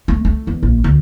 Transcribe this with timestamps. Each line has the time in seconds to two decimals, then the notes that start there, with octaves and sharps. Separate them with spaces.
0.08 A3
0.25 A3
0.47 E2
0.63 A#1
0.84 D2